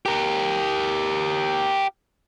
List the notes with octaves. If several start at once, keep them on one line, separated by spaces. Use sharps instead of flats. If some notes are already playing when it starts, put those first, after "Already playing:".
G4 A#4